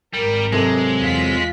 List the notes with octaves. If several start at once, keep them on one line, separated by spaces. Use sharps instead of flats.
G#1 G3 A#4
C3 F#3 G#3 A4
E2 F4 B6